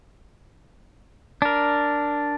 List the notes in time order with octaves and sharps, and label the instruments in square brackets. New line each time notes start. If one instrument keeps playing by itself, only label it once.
[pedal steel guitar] D4 A#4